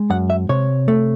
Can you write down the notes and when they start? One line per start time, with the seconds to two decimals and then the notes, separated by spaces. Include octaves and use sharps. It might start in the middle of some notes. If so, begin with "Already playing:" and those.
Already playing: G#3
0.10 F#2 F#5
0.30 E5
0.49 C3 C#5
0.88 A3